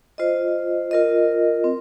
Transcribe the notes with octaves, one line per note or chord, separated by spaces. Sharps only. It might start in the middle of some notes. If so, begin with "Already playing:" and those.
F4 C5 D#5
F4 A#4 D#5
C4